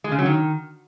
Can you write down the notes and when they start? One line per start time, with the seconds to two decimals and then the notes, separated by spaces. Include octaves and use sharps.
0.04 G#3
0.11 C#3
0.18 F#3
0.26 D#3